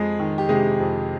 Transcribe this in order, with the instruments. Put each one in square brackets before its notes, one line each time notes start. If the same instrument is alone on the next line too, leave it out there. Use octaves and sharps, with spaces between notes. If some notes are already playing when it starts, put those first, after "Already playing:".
Already playing: [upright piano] F2 G#3 G#4
D#3
G4
C3 G#3 G#4
F2